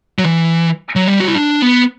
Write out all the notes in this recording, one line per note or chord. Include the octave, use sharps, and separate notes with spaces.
F#3
E3
F#3
G3
F#4
E4
D4
B3